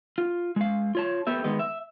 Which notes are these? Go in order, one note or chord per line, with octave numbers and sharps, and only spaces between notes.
F4
G#3 F5
F4 C#5 A5
A3 B3 G4 E5
D#3 G#3 B3 D#5
E5